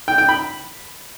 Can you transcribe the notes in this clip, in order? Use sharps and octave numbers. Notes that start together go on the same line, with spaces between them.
G5
G5
B5